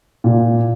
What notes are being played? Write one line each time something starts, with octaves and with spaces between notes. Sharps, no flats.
A#2